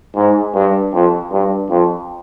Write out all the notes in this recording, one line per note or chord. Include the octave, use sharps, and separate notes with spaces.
G#2
G2
F2
G2
F2